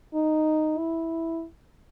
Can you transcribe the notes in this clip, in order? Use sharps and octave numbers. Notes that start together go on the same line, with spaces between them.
D#4
E4